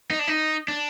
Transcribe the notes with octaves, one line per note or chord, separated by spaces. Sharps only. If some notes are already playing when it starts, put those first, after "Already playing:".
D#4
D4
D#4
D4